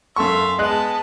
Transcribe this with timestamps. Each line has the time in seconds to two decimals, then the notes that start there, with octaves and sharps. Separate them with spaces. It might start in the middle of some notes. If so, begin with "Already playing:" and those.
0.16 F#2 A4 E5 F5 C6 C#6
0.59 G#3 B3 D#5 A5 F#6